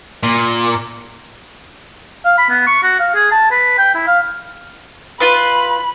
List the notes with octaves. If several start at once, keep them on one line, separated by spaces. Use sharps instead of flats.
A#2
F5
B5
B3
C#6
F#4
F5
G#4
A5
B4
G5
E4
F5
F4 B4 B5